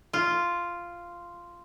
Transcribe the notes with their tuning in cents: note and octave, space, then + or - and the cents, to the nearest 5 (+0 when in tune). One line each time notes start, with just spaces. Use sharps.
F4 -5